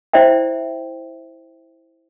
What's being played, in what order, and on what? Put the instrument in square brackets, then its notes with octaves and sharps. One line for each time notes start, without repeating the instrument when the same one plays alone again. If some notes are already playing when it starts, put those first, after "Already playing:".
[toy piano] E4 C5 D5 E5 G5